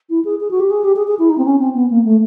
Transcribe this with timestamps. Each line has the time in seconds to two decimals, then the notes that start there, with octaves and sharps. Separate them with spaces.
0.09 E4
0.24 G#4
0.40 G#4
0.50 F#4
0.60 G4
0.70 G#4
0.84 G4
0.96 G#4
1.07 G#4
1.18 E4
1.29 D#4
1.37 C4
1.45 C#4
1.59 C4
1.75 B3
1.90 A#3
2.05 A3